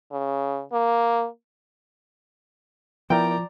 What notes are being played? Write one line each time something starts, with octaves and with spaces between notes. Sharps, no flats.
C#3
A#3
F3 B3 E4 A#4 D5 G5 A#5